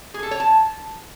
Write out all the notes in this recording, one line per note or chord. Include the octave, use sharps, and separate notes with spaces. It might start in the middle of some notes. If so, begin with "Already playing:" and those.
G#4
A4
C#5
A5